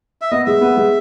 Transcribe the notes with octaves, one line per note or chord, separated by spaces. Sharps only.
E5
B3 D#5
G#3 E5
B3
G#3